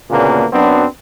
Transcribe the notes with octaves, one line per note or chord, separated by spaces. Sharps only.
D2 A#2 C#3 A#3 B3 D4
F#2 F#3 B3 C4 D4